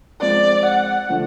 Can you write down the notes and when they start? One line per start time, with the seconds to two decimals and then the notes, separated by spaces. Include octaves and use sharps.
0.20 F3 G#3 C4 D5
0.65 F#5
1.09 D3 F3 A3 D4